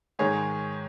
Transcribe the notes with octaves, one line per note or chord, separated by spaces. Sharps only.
G#2 D#3 G#3 G#4 C#5